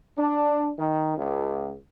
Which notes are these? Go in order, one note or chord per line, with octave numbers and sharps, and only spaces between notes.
D4
D#3
C#2